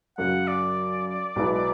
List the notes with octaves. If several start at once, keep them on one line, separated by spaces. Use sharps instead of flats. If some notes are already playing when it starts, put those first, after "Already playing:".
F#2 C#3 F#3 F#5
D5
B1 B2 G#3 B3 E4